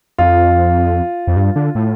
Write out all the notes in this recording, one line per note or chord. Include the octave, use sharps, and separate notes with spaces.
F2 F4
F2
G2
D3
A2